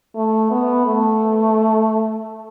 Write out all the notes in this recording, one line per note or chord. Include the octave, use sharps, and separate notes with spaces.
A3
B3
A3